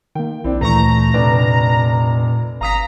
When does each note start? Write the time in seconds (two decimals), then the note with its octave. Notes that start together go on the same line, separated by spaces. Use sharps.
0.15 D#3 A#3 G5
0.44 B1 C4 D4 E4
0.61 D2 A#2 E3 A3 A#5 C#6
1.14 F1 D4 B4 D5
2.61 G1 F5 A#5 D#6 B6